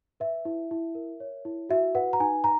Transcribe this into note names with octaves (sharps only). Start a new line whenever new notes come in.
B4 E5
E4
E4
A#4
C#5
E4
F#4 E5
B4 F#5
A#5
D#4 G#5
A#5